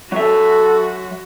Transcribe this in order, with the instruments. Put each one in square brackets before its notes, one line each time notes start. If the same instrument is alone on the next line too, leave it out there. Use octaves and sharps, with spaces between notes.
[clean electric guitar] F#3 E5 [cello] F#4 [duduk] A4